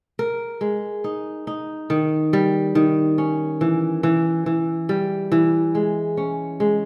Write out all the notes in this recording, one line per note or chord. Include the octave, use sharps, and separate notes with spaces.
A#4
G#3
D#4
D#4
D#3
G3
D#3
C#4
E3
E3
E3
G3
E3
G#3
C#4
G#3